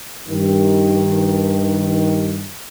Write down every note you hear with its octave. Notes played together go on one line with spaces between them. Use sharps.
G2 D#3